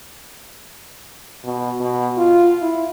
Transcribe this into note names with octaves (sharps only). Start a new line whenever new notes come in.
B2
B2
F4
E4